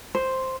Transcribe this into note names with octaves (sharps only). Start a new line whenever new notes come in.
C5